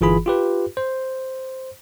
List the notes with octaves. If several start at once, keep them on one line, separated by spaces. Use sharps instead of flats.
G1 E3 F4 G#4 B5
F4 G4 B4
C5